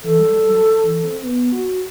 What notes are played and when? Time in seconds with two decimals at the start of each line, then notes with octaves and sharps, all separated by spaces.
0.04 E3 A4
0.19 G3
0.33 G3
0.48 F#3
0.83 E3
1.03 C4
1.22 B3
1.52 F#4